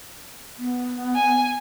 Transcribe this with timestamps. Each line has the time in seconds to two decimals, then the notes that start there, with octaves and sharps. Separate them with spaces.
0.59 B3
1.14 G#5